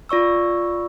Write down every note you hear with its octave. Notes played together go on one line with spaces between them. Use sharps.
F4 D5 C#6 E6